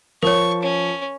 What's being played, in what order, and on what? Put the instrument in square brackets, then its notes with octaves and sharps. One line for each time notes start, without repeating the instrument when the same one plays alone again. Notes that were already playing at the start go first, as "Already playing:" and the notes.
[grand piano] F3 [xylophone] A#4 C#5 [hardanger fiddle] C#6
[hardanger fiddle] C#4